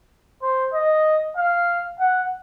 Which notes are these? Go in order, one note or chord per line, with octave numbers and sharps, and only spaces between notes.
C5
D#5
F5
F#5